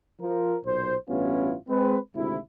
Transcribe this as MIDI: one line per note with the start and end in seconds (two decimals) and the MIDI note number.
0.20 0.56 53
0.20 0.56 70
0.64 0.94 35
0.64 0.94 46
0.64 0.94 72
1.08 1.55 33
1.08 1.55 43
1.08 1.55 59
1.08 1.55 61
1.08 1.55 64
1.08 1.55 65
1.68 1.97 56
1.68 1.97 60
1.68 1.97 71
2.14 2.37 32
2.14 2.37 38
2.14 2.37 44
2.14 2.37 48
2.14 2.37 64